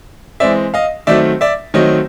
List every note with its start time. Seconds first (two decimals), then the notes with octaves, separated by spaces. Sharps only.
0.40 E3 G#3 C4 D5 E5
0.74 D#5 F5
1.07 D#3 F#3 A3 C4 D5 E5
1.41 D5 E5
1.74 D#3 F#3 A3 C4 C#5 D#5